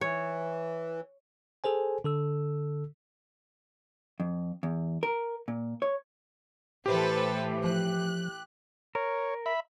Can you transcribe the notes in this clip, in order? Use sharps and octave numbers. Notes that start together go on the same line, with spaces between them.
E3 C#5
G#4 A4 C5 G#5
D3 A4 E6
F2
E2
A#4
A#2
C#5
A2 E3 G4 A4 B4 C5
F3 F#6
A#4 C#5
E5 B5